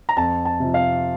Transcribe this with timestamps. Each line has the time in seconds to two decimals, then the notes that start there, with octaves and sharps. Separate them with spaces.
0.09 A#5
0.17 F2 A5
0.45 A5
0.60 C3 F3
0.74 F5